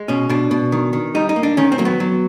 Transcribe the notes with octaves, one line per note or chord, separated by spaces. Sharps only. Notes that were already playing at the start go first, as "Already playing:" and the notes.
Already playing: G#3
B2 C#4
B2 D4
B2
D#3
D#3
G3 D#4
D#4
A#3
D4
D#3 C#4
C4
F#3 A#3
B3
F#3